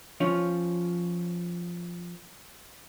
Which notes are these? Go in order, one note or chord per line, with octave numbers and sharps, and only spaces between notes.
F3 C#4 F4